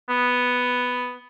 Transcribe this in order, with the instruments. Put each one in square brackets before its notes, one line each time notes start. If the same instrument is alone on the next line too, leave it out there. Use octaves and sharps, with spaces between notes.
[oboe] B3